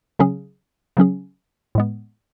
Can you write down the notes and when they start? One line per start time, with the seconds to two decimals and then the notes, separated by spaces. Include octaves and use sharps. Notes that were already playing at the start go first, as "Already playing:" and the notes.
0.19 C#3 F#3 C#4 G#4
0.97 C#3 F#3 C#4 G#4
1.75 A2 G#3 B3